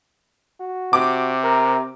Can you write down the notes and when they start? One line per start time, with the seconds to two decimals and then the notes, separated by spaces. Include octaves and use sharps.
0.60 F#4
0.93 C3 D6
1.44 A#4